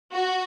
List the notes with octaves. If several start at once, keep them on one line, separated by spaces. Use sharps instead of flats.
F#4